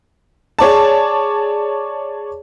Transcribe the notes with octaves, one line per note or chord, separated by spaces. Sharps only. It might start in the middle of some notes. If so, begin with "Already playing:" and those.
G#4 C#5 D5 A5